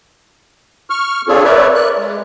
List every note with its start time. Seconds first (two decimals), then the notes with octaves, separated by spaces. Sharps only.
0.90 C#6 F6
1.28 C4 D4 F4 G#4 A4 C#5
1.44 A#4 B4 C#5 D5 E5
1.75 D5 F#6
1.98 G#3